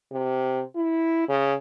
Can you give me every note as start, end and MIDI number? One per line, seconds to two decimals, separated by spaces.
0.11 0.62 48
0.75 1.24 64
1.28 1.54 49